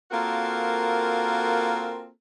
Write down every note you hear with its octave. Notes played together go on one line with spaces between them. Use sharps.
A#3 C4 F4 F#4 A4 A#4